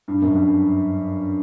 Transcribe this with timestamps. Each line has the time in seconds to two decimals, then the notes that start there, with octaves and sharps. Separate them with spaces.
0.08 G2
0.22 F#2
0.35 G2